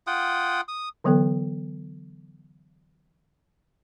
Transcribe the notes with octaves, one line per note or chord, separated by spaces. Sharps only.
F4 F#5 G5 D#6
D#6
D3 E3 F#3 B3 A4 G5